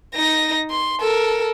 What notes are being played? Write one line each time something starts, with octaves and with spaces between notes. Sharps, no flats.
D#4 A#6
C6
A4 A#4